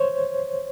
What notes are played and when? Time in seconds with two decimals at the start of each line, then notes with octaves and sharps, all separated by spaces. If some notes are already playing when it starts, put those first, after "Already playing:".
Already playing: C5 C#5